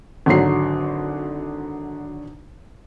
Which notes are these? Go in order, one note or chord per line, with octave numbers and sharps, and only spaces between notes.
G#1 D3 F#3 C7